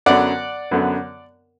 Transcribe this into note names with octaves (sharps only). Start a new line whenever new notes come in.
F#2 D3 F#3 B3 D5 F#5
F#2 D3 F#3 B3